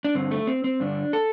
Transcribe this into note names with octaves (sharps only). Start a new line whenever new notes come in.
D4
G2 D3 C4
A3
C4
C4
G2 D3 D4
A4